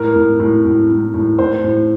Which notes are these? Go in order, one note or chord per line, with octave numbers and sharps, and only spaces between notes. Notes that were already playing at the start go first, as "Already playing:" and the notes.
Already playing: A2 A#4
A2
A2
A2
A2
A2
A2 C5
A2